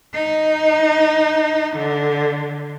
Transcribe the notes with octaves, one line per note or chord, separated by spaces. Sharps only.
D#4
D3